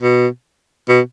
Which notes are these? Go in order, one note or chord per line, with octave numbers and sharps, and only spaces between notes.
B2
B2